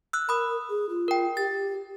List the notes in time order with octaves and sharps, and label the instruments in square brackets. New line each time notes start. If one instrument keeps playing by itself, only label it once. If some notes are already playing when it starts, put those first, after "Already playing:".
[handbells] E6 F#6
[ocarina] A#4 [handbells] B5 D#6
[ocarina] G#4
F4
[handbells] A#4 G5
[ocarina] G4 [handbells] A6